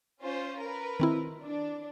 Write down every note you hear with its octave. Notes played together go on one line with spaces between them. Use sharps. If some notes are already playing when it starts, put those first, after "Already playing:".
C#4 F4 C5
A#4 B4
D#3 C4 E4
D4